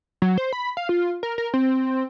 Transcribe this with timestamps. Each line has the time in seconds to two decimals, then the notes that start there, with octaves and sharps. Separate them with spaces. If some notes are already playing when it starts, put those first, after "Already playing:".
0.22 F#3
0.38 C5
0.53 B5
0.77 F5
0.89 F4
1.23 A#4
1.38 A#4
1.54 C4